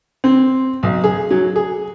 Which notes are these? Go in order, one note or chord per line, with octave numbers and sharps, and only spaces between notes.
C4
B1
G#4
F#3
G#4